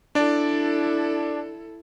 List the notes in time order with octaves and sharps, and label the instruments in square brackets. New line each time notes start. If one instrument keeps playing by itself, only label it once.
[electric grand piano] D4 D5 [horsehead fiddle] E4 A4